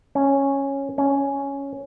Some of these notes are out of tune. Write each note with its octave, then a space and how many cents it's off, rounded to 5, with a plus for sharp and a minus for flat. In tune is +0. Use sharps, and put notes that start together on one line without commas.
C#4 -5
C#4 +5